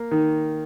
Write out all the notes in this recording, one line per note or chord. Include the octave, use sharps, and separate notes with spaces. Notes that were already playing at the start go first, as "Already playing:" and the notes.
Already playing: A#3
D#3